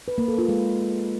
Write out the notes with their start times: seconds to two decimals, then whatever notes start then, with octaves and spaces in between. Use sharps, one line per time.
0.08 B4
0.18 A#3
0.28 A4
0.38 F4
0.49 G#3